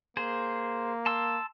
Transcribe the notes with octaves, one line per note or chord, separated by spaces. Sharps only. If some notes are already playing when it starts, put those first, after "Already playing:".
A#3 G#4 C5
A5 C6 E6